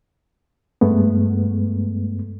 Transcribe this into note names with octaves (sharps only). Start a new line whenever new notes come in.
G2 G#3 A3 B3